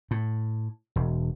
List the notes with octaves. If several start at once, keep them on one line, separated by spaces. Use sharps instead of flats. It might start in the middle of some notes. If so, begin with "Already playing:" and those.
A2
E1